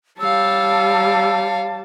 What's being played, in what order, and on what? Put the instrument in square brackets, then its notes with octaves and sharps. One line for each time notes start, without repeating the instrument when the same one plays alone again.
[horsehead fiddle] G3 A5 [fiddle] C#5 F5 [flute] E6